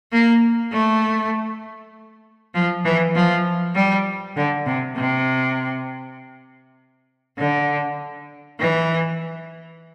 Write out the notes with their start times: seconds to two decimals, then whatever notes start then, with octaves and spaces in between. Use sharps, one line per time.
0.13 A#3
0.72 A3
2.55 F3
2.85 E3
3.15 F3
3.75 G3
4.36 D3
4.66 C3
4.96 C3
7.38 D3
8.60 E3